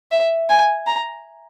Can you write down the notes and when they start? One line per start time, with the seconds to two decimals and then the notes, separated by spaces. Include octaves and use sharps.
0.11 E5
0.49 G#5
0.87 A#5